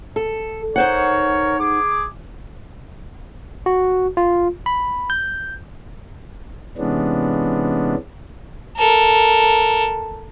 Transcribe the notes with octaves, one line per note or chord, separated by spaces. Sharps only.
A4
D#4 A#4 C5 C#5 F#5
G#4 D6
F#4
F4
B5
G6
C3 E3 G#3 B3 C#4 D4
A4 A#4